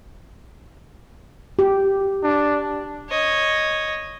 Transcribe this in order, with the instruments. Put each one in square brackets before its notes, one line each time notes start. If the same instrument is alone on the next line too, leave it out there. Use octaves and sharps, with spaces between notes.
[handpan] G4
[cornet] D4
[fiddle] C#5 D#5